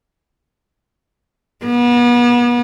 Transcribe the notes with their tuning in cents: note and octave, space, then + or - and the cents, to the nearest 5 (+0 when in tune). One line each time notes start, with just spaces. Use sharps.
B3 -35